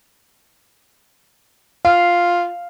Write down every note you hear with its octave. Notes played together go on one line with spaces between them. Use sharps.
F4 F5